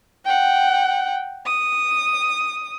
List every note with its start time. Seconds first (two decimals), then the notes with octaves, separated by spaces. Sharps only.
0.25 F#5 G5
1.46 D#6